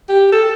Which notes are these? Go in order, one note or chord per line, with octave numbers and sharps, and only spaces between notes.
G4
A4